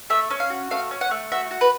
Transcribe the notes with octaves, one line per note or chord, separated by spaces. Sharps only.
A3 E5
C#4
F5
F#4
A3 F5
C#4
F#5
A3
F#4 E5
F#4
B4